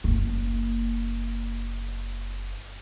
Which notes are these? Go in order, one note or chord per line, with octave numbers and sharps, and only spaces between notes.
F#1 A#3